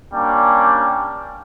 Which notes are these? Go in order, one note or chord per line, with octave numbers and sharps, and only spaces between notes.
G3 A#3 C#4 D4